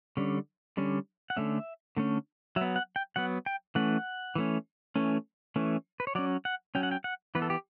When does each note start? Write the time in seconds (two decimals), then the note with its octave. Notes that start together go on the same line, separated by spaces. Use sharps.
0.17 D3 G3 C#4
0.77 D3 G3 C#4
1.30 F#5
1.37 D3 A3 C#4 E5
1.97 D3 A3 C#4
2.56 F#3 E5
2.61 B3
2.76 F#5
2.96 G5
3.16 F#3 B3 F#5
3.46 G5
3.75 E3 A3 C#4 F#5
4.35 E3 A3 C#4
4.96 E3 A3 C#4
5.56 E3 A3 C#4
6.00 B4
6.07 C#5
6.15 F#3 C#4 D5
6.45 F#5
6.75 F#3 C#4 G5
6.83 F#5
6.91 G5
7.04 F#5
7.35 E3 B3 B4
7.42 A4
7.50 G4